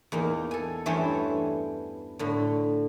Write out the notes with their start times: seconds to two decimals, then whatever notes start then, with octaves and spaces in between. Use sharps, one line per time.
0.12 E2 A#3 D#4
0.51 A4 G#5
0.86 G2 E3 A3 B3 C#4 C5
2.19 A2 D3